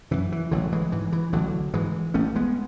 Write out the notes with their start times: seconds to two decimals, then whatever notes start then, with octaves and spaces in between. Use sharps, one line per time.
0.11 F#2 C#3 E3
0.32 E3
0.51 A1 D3 F#3
0.72 E3 G#3
0.92 G#2 E3
1.12 E3
1.33 A1 D3 F#3
1.74 G#2 E3 G#3
2.14 A1 A3 C#4
2.36 G#3 B3